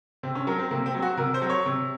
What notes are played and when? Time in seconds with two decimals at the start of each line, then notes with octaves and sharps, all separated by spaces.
0.23 C3 C4
0.35 C#4
0.47 F#3 A#4
0.59 C4
0.71 C3 A#3
0.86 C4
0.94 F#3
1.02 F#4
1.17 C3 A#4
1.34 C5
1.42 F#3
1.49 C#5
1.66 C3